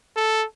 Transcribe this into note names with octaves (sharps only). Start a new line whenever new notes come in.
A4